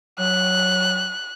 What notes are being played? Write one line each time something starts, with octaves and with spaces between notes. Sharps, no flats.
F#3 F#6